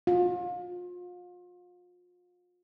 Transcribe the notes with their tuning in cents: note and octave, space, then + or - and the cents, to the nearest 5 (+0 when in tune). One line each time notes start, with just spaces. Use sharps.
F4 +35